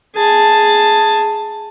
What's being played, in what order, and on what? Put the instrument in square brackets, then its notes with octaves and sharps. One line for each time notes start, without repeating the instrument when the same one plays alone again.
[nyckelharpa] G#4 A5